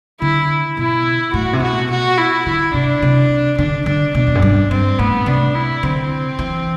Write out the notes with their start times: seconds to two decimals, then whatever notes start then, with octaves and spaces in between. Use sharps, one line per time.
0.21 D3 E4
0.77 B2 E4
1.33 A2 F#4
1.53 C3
1.62 B2 F#4
1.90 F#4
2.17 E4
2.46 D3 E4
2.74 C3 D4
3.02 C3
3.58 D3 D4
3.86 D3 D4
4.15 B2 D4
4.27 E2
4.35 F#2
4.42 G2
4.71 G2 C4
4.98 A2 B3
5.26 C3 D4
5.54 E4
5.83 D3 C4
6.39 E3